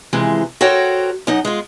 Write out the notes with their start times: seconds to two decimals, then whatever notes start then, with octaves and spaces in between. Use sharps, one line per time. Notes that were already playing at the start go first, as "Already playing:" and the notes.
0.13 C3 E3 F3 G#3
0.61 F#4 A4 A#4 C5 C#5 G5
1.27 F#2 D#4 F#5
1.45 G#3 F4